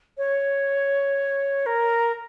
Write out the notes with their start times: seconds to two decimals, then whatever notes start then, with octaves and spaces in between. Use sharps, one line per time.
0.18 C#5
1.66 A#4